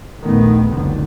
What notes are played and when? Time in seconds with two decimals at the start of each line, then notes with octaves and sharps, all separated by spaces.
0.20 A#1 D#2 D#3 A3 B3
0.69 F#1 C#2 D3 D#3